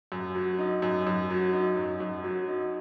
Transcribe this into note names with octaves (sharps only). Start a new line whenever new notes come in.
F#2
F#3
D#4
F#2
F#2
F#3
D#4
F#2
F#2
F#3
D#4